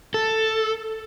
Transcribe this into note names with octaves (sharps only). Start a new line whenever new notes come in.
A4